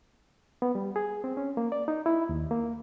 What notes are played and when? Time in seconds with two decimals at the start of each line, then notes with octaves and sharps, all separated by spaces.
0.62 B3
0.75 G3
0.96 G#4
1.24 C4
1.37 C#4
1.57 A#3
1.72 D5
1.88 D#4
2.06 E4
2.29 D#2
2.51 A#3